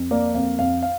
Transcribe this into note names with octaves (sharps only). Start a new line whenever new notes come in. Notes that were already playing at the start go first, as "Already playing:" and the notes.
Already playing: F2
A#3 D5
F2 F5
F2 F5
F5